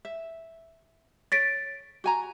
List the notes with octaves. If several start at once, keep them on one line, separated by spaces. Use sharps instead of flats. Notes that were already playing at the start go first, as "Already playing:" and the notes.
E5
C#5 A6 B6 D7
F#4 G#5 A#5